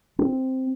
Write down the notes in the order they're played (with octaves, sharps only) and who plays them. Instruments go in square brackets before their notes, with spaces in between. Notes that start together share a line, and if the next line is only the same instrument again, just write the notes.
[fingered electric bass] C4